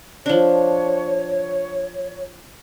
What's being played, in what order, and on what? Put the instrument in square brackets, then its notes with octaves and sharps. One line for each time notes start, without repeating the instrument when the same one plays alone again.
[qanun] F3 D4 [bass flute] C#5